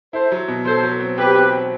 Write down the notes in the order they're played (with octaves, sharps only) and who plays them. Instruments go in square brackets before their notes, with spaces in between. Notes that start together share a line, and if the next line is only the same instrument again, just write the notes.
[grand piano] E4 [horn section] A4 C5
[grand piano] F#3
B2
[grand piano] F#3 [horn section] A4 C5
[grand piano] F#3
C4
[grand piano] C4 [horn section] G4 B4
[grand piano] C4
C4